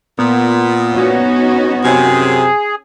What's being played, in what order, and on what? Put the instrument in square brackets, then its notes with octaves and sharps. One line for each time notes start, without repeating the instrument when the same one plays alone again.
[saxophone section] A#2 [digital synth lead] B3
[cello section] C#4 D#4 F#4
[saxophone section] F#2 C3 [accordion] G#4